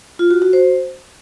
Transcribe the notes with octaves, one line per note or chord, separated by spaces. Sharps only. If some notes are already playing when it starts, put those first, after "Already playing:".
F4
F#4
F#4
C5